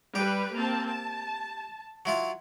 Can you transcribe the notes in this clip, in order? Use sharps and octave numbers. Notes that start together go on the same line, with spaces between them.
G3 G4 B4
A#3 C4 A5
A5
F#3 E4 F4